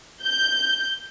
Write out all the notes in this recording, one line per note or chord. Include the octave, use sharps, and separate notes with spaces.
G6